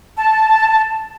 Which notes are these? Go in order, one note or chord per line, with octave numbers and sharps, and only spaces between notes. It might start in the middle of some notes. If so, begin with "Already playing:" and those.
A5